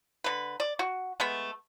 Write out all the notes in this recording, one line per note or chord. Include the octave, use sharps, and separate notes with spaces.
D3 B4
D5
F#4
G#3 A3 B3